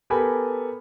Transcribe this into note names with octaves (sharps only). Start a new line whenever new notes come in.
B3 G4 A4 A#4 G#5 B5